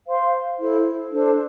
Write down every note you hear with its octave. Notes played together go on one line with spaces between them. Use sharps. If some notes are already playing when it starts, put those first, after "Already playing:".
C5 F5 C6
E4 A4 C5
D4 A4 C5